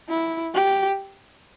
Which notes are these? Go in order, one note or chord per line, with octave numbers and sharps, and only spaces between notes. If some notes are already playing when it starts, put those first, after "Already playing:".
E4
G4